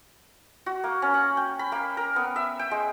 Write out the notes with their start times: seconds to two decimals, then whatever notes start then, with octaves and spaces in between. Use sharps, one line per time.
0.66 F#4
0.84 A#3
1.02 C#4
1.14 F#5
1.37 G5
1.59 B5
1.72 A#3
1.97 A#4
2.16 B3
2.36 E5
2.59 G5
2.71 G#3